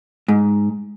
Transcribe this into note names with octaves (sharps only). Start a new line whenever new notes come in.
G#2